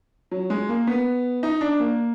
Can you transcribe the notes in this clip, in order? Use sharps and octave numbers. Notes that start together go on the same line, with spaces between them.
F#3
G#3
A#3
B3
D#4
D4
A#3